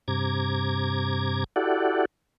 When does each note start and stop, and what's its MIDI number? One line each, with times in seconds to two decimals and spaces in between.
0.08 1.44 43
0.08 1.44 48
0.08 1.44 82
0.08 1.44 86
0.08 1.44 92
1.56 2.05 64
1.56 2.05 66
1.56 2.05 67
1.56 2.05 69
1.56 2.05 74
1.56 2.05 78